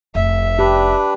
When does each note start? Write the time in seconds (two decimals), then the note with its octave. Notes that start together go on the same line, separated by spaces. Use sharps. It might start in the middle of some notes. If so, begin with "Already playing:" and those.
0.15 F1 E5
0.59 D4 G4 B4 D5